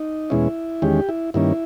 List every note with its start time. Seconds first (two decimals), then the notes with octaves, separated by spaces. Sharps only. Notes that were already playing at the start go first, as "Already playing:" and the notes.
Already playing: D#4
0.30 E2 B2 G#3 C#4 E4
0.82 E2 D#3 G#3 C#4 G4
1.09 E4
1.34 G2 D#3 A#3 C#4 E4